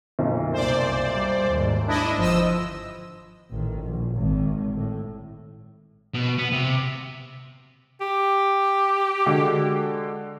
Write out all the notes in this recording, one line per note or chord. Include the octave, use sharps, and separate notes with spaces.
B1 F#2 A#2
C2 C5 D5
G3
D#2 G#2
D4 E4 D#5
G1 F3 D#5 E6
A1 D#3
A#1
G#1 D#3
A2
B2
B3
C3
G4
D3 G#3 F#4